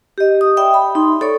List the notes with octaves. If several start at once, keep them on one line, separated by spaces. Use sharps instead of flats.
G4 D#5
D#6
D5 E5 G5 B5 D#6
B5
D#4 C6
A4 C#5 D5 C#6